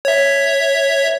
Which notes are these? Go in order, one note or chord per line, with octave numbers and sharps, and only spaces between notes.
C#5 E5